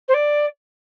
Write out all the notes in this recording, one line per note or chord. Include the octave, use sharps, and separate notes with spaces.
C5
D5